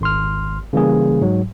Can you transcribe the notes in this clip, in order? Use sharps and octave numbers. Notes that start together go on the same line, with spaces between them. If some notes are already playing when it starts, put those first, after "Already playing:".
G#1 C6 F6
C#3 E3 G3 A#3 G#4
G#2 F#3